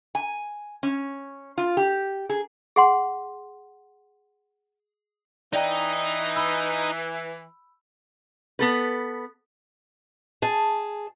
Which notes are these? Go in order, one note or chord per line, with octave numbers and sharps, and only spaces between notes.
G#5
C#4
F4
G4
G#4
G#4 F#5 C6
E3 D#4 D5 D#5 G5 A#5
B5 E6
B3 A4 B4
G#4 A5